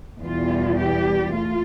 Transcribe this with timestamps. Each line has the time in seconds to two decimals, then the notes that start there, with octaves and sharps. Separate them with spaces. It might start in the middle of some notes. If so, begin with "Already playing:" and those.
0.23 E2 B2 G3 F4
0.78 G4
1.33 A3 F4